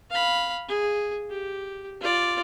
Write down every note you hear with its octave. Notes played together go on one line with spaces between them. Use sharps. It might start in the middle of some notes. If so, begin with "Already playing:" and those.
F5 B5
G#4
G4
F4 D5